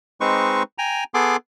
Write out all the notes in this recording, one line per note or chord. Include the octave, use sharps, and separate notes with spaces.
G#3 C4 D#4 B4 C5 C#6
G5 G#5 A#5
B3 G#4 A4 C6 D6